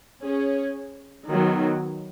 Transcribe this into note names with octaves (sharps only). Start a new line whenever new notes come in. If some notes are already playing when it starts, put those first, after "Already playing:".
C#4 G#4 C#5
D#3 F#3 B3